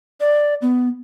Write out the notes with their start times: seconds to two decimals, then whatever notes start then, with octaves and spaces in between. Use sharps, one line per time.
0.20 D5
0.62 B3